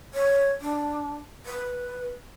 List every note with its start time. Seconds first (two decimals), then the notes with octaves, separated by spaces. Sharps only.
0.14 C#5
0.61 D4
1.46 B4